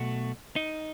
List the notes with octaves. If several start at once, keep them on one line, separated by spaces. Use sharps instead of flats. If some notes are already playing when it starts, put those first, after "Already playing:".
Already playing: B1 B2 A3 F#4
D#4